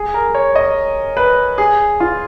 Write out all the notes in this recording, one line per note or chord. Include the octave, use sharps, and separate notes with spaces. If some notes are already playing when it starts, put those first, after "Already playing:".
Already playing: G#4
A#4
C#5
D#5
B4
G#4
F4